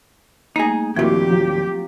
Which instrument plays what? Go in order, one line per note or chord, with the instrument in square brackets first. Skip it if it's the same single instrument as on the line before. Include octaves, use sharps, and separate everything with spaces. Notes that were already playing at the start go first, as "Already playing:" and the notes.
[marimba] G3 A3 A#3 [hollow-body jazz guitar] D#4 G#4
[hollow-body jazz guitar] D#2 A#2 [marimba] F3 C4 [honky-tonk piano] E4 F#4 A#4 [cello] G4
[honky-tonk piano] F#3 F4